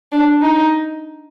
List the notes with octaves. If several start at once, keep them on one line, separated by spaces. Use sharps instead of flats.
D4
D#4